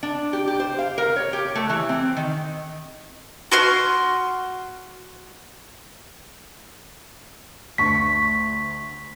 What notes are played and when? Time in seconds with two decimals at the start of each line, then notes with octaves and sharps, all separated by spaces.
0.03 D4
0.33 G4
0.47 G4
0.60 C5
0.79 F5
0.98 A#4
1.16 C#5
1.33 G4
1.55 A3
1.69 E3
1.89 C4
2.17 D#3
3.52 F#4 C6 F6
7.78 D2 C#6 B6